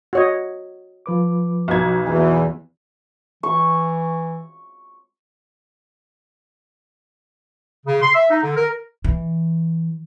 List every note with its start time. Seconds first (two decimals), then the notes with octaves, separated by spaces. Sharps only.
0.13 F#4 C#5 D#5
1.06 F3 B4 D6
1.68 B1 B2 G#6
2.07 E2 E3 G#5
3.43 E3 C#6
7.86 C#3
8.02 C6
8.14 E5
8.30 D#4
8.43 D3
8.57 A#4
9.04 E3